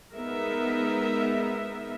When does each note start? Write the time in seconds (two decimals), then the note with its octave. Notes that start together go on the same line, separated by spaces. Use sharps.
0.16 G#3 B3 D#4 A#4 E5